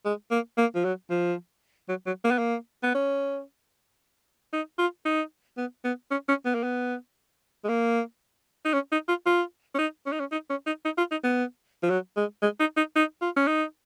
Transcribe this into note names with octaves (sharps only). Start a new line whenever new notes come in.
G#3
A#3
A#3
F3
F#3
F3
F#3
F#3
A#3
B3
A#3
B3
C#4
D#4
F4
D#4
B3
B3
C#4
C#4
B3
A#3
B3
G#3
A#3
D#4
C#4
D#4
F4
F4
C#4
D#4
C#4
D#4
C#4
D#4
C#4
D#4
D#4
F4
D#4
B3
F3
F#3
G#3
G#3
D#4
D#4
D#4
F4
C#4
D#4